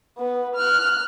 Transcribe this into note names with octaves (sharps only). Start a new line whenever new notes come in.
B3 B4
F6 F#6